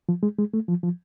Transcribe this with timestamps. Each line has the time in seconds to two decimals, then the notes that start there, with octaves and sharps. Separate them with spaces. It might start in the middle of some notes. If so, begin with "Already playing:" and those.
0.09 F3
0.23 G#3
0.39 G#3
0.54 A3
0.68 F3
0.83 F3